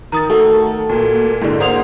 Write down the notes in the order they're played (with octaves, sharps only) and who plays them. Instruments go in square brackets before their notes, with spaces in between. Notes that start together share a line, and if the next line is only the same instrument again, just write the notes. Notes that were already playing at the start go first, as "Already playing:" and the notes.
[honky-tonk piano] D#3 [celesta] A#5 D#6 A6
[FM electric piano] A3 F#4 A4 [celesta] A5
[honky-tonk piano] A#2
[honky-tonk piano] G#2 D3 [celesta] E4 G#4 D5
[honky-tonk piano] A#3 C5 [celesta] F#5 D#6 F7